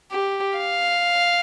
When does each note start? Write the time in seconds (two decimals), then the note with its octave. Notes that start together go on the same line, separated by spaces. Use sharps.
0.12 G4
0.58 F5